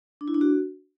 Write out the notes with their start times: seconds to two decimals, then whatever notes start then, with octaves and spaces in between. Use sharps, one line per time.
0.21 D4
0.28 E4
0.34 D4
0.41 F#4